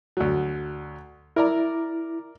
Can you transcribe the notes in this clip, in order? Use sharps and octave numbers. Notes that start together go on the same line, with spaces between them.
D2 F#3
E4 A#4 D5 A#5